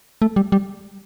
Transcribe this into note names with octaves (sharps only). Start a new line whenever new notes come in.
A3
G3
G3